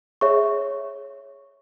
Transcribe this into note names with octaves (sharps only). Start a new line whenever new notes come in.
G#4 C#5 E5 C#6